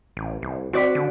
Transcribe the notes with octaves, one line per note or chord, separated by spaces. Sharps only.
A1
C2
C4 F#4 D5 B6
D3